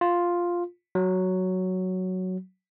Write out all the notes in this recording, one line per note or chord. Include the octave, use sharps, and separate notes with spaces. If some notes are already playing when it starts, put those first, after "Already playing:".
F4
F#3